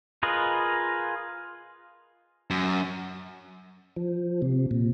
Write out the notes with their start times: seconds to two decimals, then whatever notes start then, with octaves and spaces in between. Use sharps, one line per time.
0.23 F4 G#4 A#4 B4 D#5
2.50 F#2
3.96 F3
4.42 C3
4.71 A#2